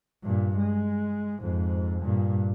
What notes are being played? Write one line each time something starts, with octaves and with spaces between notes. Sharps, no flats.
G2 A#2
G#3
F2 G#2
G2 A#2